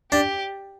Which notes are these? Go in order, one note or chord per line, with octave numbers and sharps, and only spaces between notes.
D4 G4